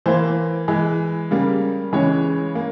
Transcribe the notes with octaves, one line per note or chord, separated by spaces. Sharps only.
E3 A#3 C5
E3 G#3
C#3 G3 A#3
C#3 E3 G#3 C#5
A#3